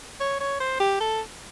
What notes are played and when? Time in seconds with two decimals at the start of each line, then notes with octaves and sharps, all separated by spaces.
0.20 C#5
0.40 C#5
0.60 C5
0.80 G4
1.00 A4